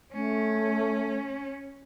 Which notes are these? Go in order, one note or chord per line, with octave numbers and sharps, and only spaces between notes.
A3 C#4